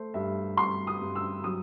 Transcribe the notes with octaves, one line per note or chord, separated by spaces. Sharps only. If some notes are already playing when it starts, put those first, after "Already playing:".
Already playing: A3 C5
G2 E5
G2 C6
D#6
G2
E6
F#3 D#6